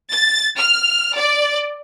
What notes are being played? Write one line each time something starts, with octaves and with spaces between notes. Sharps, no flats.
A6
F6
D5